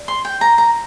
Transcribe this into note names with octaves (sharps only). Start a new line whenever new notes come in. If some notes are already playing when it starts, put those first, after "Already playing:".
Already playing: D5
C6
G5
A#5
A#5